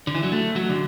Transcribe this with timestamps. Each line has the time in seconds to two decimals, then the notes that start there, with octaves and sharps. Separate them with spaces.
0.07 D3
0.15 E3
0.23 F#3
0.32 A3
0.56 F#3
0.69 D3